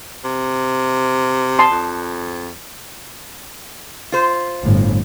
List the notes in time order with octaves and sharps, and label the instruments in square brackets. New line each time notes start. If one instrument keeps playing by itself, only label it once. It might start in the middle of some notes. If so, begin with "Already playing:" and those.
[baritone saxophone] C3
[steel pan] A5 C6 D#6
[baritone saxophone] F2
[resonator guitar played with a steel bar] F4 C5
[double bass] G1 A2